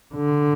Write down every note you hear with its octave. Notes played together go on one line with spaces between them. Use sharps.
D3